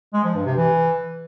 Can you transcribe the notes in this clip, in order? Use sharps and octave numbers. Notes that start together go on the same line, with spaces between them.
G#3
F3
G2
C3
E3